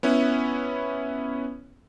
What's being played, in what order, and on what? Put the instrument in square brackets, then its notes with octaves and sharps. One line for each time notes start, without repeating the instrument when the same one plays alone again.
[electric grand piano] B3 C#4 E4 B4